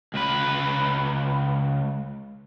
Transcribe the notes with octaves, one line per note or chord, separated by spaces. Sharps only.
C#2 B4